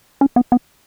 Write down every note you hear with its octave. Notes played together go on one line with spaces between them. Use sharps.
C#4
B3
B3